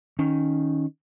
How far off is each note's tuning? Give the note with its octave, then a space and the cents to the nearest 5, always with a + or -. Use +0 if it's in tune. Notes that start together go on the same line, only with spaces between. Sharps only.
D#3 +0 C#4 +0